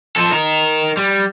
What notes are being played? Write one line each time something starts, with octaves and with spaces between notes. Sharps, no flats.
F3 A4
D#4 A#4
G3